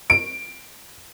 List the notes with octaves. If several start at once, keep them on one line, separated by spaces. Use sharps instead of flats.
D7